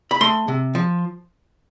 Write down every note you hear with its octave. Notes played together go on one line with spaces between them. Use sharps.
B5
A3 C6
C3
F3